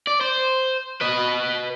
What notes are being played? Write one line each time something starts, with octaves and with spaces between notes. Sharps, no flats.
D5
C5
B4 D#5